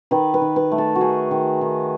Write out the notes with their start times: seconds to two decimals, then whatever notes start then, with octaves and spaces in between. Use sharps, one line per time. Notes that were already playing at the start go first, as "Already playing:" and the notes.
0.11 D#3 B4
0.34 B4
0.41 D#3
0.56 B4
0.71 A3
0.78 A4
0.95 F#4
1.01 D#4 G#4
1.31 D#3
1.61 D#3